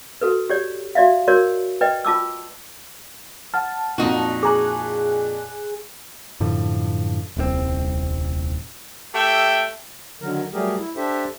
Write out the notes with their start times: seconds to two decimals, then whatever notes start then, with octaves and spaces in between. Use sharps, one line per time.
0.21 F#4 A4 B4
0.50 G4 C#5 D5
0.95 F#4 D5 E5 F5
1.28 F#4 A#4 C#5 D5
1.81 B4 D5 D#5 G5
2.05 F4 A5 D6 E6
3.54 F#5 A5 F6
3.98 F2 A#2 D#4 F#4
4.43 G#4 G#5 A#5 D6 F#6
6.40 F#2 A2 D3 F3
7.37 D#1 C2 C3 C4
9.14 A3 G4 E5 G5
10.22 D3 D#3 F#3 A#4
10.53 F#3 G3 A3 G4 G#4 A#4
10.79 E4
10.96 D4 G4 A4 C5 E5